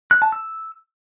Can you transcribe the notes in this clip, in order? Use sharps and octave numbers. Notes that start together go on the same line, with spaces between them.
F#6
A5
E6